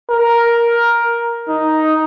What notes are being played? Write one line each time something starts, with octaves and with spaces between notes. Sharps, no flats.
A#4
D#4